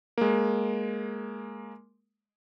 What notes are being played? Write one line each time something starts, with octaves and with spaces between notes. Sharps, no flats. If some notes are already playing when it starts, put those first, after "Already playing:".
G#3 A#3